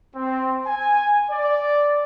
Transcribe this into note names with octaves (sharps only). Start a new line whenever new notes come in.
C4
G#5
D5